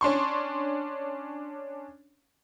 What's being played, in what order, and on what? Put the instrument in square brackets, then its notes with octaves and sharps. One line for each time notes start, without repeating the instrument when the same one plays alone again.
[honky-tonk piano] C#4 D4 C6 C#6